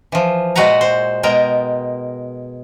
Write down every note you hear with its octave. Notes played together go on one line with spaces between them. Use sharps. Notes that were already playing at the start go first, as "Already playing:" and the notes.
E3 F3
A#2 G#3 F#4 B4 F#5 A#5
C5
B2 G#3 A#4 G5 A#5